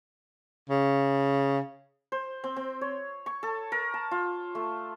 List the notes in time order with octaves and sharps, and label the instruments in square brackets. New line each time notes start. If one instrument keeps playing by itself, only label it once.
[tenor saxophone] C#3
[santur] C5
C4
C4
C#5
C#6
A4
A#4
A5
F4
A3